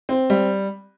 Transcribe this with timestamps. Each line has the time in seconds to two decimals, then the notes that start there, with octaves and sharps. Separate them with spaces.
0.09 C4
0.30 G3